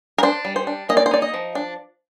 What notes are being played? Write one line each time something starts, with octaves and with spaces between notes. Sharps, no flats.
A#4
D4 C5
G3
C5
D4
A#3 D#5
D5
C5
D#4 D5
D#5
F3
D4